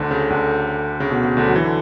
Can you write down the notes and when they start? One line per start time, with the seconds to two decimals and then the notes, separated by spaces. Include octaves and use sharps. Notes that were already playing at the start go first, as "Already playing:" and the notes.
Already playing: D2 D3
0.11 C#3
0.30 D2 D3
1.00 C#3
1.10 B2
1.24 C#3
1.37 D2 D3
1.48 F#3
1.56 E3
1.64 D3